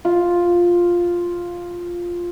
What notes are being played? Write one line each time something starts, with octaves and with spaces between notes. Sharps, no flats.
F4